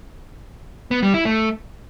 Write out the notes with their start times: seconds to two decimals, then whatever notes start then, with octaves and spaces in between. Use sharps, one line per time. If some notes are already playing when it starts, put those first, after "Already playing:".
0.91 B3
1.03 G3
1.14 E4
1.25 A3